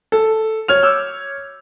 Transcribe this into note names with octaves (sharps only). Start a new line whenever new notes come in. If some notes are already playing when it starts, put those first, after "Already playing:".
A4
C#5 F6 F7
D6 E6 G6